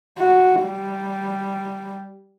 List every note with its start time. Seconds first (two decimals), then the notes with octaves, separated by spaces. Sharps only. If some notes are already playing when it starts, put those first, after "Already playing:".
0.18 F#4
0.63 G3